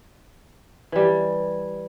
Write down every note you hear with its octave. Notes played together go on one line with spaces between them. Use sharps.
E3 G3